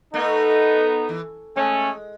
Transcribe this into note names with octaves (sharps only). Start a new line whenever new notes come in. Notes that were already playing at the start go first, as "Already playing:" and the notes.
A3 B3 D#4
E3
G#3 A3 C#4